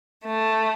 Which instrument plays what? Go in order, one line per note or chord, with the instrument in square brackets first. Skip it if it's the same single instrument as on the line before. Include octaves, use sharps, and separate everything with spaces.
[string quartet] A3